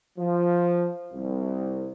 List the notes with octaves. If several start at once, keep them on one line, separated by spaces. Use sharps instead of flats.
F3
C2